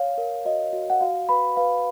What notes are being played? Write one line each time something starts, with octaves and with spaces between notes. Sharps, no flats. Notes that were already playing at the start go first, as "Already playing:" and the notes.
Already playing: C#5 F5
A#4
F#4 D#5
F#4
F#5
F#4 F5
B4 B5
B4 F5